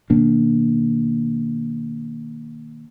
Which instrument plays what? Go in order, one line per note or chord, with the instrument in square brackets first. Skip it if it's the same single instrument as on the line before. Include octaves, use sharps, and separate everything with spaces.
[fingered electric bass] B2 D#3 A#3 D4